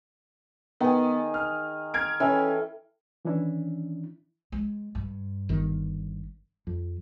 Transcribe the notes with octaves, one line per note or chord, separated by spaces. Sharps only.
D#3 B3 G#4
F6
F6 G#6 D7
E3 C#4 A4 G5
D#3 E3 C#4 D4 E4
G#3
G2
G1 D#3
F2